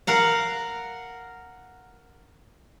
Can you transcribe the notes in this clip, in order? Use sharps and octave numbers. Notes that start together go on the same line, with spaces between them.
A#4 F5 F#5 A#5